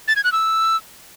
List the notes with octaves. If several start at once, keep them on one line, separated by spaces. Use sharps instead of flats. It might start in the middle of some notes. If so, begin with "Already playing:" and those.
A6
G#6
F#6
E6